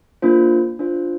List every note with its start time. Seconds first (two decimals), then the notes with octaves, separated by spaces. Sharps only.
0.22 A#3 D4 F4 C5
0.79 D4 F4 C5